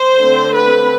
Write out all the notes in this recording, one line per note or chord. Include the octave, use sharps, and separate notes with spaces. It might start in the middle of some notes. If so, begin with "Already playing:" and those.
Already playing: C5
D3 A3 C4
B4